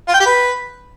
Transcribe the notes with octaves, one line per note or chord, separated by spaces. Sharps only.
F4
G5
G4
B4